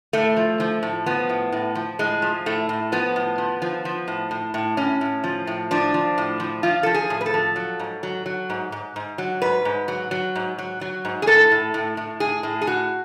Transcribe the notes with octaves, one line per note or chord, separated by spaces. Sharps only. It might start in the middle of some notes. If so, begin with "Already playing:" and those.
A2 A3
F3
F3
A2
F3 B3
A2
A2
F3
A2 G#3
F3
A2 A3
A2
F3 B3
A2
F3
F3
F3
A2
A2
A2
A2 C#4
A2
F3
A2
F3 D4
F3
A2
F3
F3 F4
F3 A4
G#4
A2
B4
A4
F3
F#3
G#2
F#3
F#3
G#2
G#2
G#2
F#3
G#2 B4
G#2
F#3
F#3
G#2
F#3
F#3
G#2
G#4
A2 A4
A2
A2
A2
A2 G#4
A2
G#4
A2 F#4